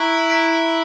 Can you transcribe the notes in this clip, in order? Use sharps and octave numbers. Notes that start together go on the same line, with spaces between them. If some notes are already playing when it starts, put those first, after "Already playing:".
Already playing: E4 A#5 C#6 F#6 B6 D7
A#5 C#6 F#6 B6 D7